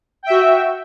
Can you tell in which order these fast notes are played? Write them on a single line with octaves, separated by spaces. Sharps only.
G5 E5 F#4